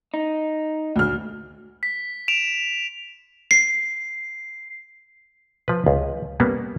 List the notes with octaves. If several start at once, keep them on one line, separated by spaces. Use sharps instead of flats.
D#4
D2 F6
B6
D7 E7 F7
C7
F3 B4
C#2
G3 A#3 B3 C#4